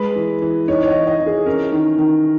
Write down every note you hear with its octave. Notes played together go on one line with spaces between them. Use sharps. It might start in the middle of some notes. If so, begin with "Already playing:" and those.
Already playing: G#3 B4
E3
E3
D#4 C#5
C#5
D#5
E3
D#5
E3
G#4
C#4 A#4
D#3
D#3